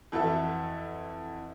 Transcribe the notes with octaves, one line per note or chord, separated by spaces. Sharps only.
F2 E3 F#4 A4 E5